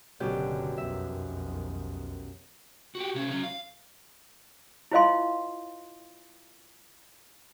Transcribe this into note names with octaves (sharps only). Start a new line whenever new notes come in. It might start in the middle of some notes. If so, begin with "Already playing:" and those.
F#1 F#2 B2 D3 G#3 G4
B1 F2 D#3 E5
F#4 G4
C3 C#4
F#3 C#4
F5
E4 F4 C5 D#5 F5 C6